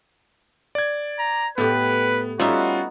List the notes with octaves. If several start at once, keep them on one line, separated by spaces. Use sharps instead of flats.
D5 G#6
A#5
A2 B3 G4 B4
G3 B3 C#4 D#4 F4 F#4 E5